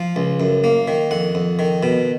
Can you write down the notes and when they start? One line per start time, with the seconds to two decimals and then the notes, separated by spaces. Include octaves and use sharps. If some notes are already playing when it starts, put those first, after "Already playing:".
Already playing: F3 F5
0.16 C#2
0.40 F#2
0.64 A#3
0.88 D#3
1.11 F2 F#5
1.35 F2
1.59 D#3
1.83 B2